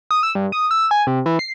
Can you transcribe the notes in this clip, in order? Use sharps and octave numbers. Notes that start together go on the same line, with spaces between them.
D#6
E6
G2
D#6
E6
G#5
C3
E3
C7